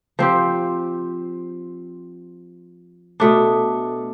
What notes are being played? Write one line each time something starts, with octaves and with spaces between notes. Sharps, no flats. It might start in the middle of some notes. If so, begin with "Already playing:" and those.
F3 C4 G4
B2 A3 D4